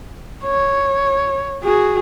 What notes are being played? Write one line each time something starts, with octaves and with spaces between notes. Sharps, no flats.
C#5
F#4 G#4